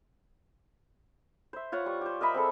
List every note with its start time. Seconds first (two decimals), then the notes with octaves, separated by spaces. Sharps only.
1.53 C5 E5
1.72 F4 C#5 F#5
1.86 G3 C#6
2.01 G4 C5
2.21 A#4 D#5 E5 B5
2.34 C4 G#4 A4 B5